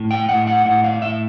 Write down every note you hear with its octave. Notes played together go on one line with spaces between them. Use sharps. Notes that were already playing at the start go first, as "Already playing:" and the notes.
Already playing: A2
G5
A2 F#5
F#5
A2 F#5
F5
A2 E5